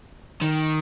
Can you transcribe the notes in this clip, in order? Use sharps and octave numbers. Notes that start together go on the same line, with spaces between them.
D#3